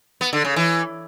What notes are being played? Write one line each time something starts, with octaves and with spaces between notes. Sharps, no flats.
B3
D3
C#3
E3